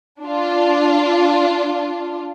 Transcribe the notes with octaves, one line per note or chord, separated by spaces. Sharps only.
D4 F4